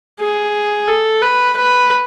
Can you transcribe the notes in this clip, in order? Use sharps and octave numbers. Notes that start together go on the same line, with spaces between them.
G#4
A4
B4
B4